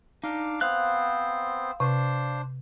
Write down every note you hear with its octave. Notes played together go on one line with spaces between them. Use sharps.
D4 D#4 F5 D6
B3 C4 C5 F5 F#6
C3 D4 C5